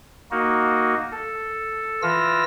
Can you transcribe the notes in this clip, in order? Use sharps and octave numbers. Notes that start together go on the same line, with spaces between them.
A#3 D#4 F#4
A4
E3 F4 E6 A#6